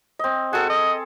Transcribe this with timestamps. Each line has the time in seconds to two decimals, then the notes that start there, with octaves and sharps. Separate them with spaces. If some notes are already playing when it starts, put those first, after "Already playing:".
0.19 C4 D#5
0.53 F#4 G#4 A4
0.70 D#5